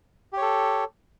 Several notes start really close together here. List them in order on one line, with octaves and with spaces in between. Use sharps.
G4 C#5 A4